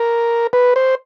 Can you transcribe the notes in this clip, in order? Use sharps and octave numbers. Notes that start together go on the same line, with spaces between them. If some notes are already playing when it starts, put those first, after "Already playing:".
Already playing: A#4
B4
C5